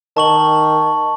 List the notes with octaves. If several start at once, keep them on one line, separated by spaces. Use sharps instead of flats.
D#3 A5 C#6 F#7